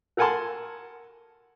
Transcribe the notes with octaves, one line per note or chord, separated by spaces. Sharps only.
A4 A#4 F#5 G#5 A5 C6